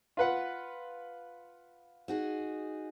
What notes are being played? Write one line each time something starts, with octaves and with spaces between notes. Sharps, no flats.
F4 B4 F#5
D#4 F#4 G#4